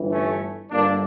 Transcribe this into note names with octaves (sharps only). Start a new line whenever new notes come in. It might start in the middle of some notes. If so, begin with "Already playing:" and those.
Already playing: G1 G2 E3
A3 C#4
G1 G2 D3 A#3 D4